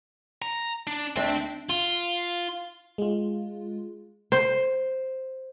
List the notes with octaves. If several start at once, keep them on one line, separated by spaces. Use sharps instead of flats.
A#5
D4
D2 C4 D4 E5
F4
G#3 F4
C5